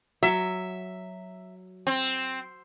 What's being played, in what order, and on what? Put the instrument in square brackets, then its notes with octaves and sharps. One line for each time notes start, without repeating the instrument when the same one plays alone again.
[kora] F#3 [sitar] E5
[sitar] C4